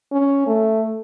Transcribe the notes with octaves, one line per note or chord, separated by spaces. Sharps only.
C#4
A3